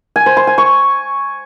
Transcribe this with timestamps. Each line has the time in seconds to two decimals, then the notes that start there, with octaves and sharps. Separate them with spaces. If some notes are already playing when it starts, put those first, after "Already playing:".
0.16 G#5
0.26 C5
0.37 C6
0.47 G#5
0.58 C#6